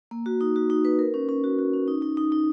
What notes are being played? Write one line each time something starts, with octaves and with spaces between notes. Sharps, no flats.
A#3
F#4
D#4
F#4
D#4
B4
A#4
C#4
C#4
F#4
F#4
C#4
D#4
D#4
D#4
D#4